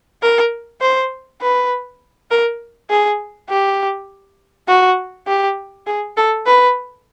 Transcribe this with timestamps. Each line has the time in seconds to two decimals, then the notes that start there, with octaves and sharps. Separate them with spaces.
0.22 A#4
0.81 C5
1.42 B4
2.31 A#4
2.90 G#4
3.49 G4
4.68 F#4
5.27 G4
5.86 G#4
6.17 A4
6.46 B4